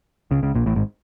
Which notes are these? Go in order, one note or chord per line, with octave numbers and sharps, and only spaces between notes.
C#2 C#3
C#2 C#3
A#1 A#2
A1 A2
G#1 G#2